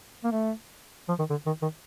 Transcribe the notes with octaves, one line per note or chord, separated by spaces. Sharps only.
A#3
A3
F3
D#3
D3
D#3
D#3